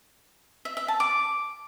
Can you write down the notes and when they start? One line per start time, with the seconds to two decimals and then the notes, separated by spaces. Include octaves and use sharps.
0.65 E5
0.77 E5
0.88 A5
1.00 D6